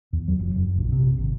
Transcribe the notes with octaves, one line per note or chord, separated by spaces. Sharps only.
E2
F#3
F1
F#1
A#1
C3
G#1